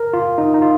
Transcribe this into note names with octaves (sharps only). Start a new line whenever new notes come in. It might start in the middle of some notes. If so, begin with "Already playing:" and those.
Already playing: A#4
F4
D#4
D#4
F4